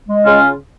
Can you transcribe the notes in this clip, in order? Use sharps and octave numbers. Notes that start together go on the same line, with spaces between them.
G#3
C#3 C#4 F4